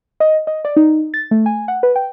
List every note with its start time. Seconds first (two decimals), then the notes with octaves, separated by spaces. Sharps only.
0.20 D#5
0.47 D#5
0.65 D5
0.76 D#4
1.14 A6
1.31 A3
1.46 G#5
1.68 F#5
1.83 B4
1.96 G5